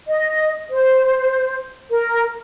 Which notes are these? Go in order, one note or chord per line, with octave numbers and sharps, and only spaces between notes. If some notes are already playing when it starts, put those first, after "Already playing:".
D#5
C5
A#4